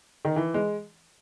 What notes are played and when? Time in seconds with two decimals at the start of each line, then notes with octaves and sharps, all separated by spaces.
0.25 D#3
0.36 E3
0.54 G#3